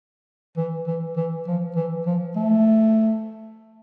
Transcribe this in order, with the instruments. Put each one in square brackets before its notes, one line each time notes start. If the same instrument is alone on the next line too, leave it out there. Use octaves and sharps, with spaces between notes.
[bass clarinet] E3
E3
E3
F3
E3
F3
A3